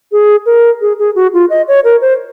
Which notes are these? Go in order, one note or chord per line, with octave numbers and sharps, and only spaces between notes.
G#4
A#4
G#4
G#4
F#4
F4
D#5
C#5
A#4
C5